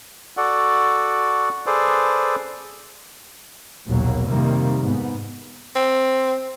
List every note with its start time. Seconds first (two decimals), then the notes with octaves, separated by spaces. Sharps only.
0.37 F#4 A4 D5 F#5
1.66 G#4 A4 B4 C5 D5
3.87 A#1 D#2 B2 F#3 A#3
4.28 F2 C3 D#3 G3 A#3
4.82 G#2 B3
5.76 C4